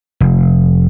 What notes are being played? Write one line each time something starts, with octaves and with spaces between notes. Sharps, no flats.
F1